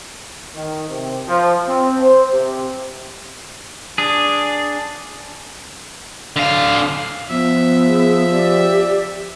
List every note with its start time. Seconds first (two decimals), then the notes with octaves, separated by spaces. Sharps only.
0.55 D#3
0.89 C3
1.27 F3
1.67 C4
2.01 C5
2.32 C3
3.98 D4 G#4
6.36 D3 F5
7.30 F3 B3 E5
7.86 G#4
8.31 G4 D5